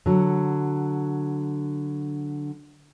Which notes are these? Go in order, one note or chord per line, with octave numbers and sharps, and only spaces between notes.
D3 F#3